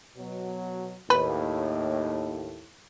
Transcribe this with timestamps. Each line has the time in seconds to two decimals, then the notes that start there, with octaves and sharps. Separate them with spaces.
0.17 B2 F#3
1.10 D#2 A2 B4